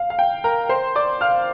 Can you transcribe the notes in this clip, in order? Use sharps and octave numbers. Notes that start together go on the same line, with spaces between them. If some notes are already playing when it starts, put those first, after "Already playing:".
Already playing: F5
F5
G5
A#4 A#5
C5 C6
D5 D6
F5 F6